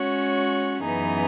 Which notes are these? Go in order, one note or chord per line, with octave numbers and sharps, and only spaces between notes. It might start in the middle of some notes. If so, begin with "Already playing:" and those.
Already playing: G#3 C#4 F#4 C#5
F#2 E3 B3 D#4 G#4